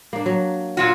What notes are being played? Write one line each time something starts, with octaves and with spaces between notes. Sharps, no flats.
A#3 D4
F#3
A#2 F4 F#4